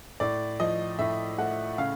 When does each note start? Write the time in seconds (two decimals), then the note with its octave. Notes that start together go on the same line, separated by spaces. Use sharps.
0.20 A2 D5
0.60 F3 D#5
0.99 A2 E5
1.38 A3 F#5
1.78 C#3 F5